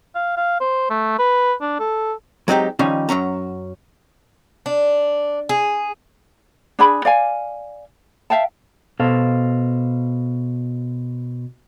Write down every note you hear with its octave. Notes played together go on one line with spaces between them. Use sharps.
F5
F5
C5
A3
B4
D4
A4
F#3 G#3 C4 D#4 G4
D#3 F3 G3 C#4 D#4
F#2 F#3 C#4 A#5
D4
G#4
D4 G#4 B5
D5 F5 G#5
E5 F5 G5 A5
B2 A4 C5 F5